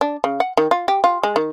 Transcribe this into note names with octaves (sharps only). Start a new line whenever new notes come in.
D4
C#3
F#5
D#3
F4
G4
F4
G#3
D#3